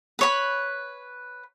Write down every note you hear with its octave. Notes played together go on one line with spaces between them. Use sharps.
B4 C#5 B5